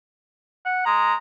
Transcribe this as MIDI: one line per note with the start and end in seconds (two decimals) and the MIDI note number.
0.65 0.84 78
0.86 1.14 56
0.86 1.16 82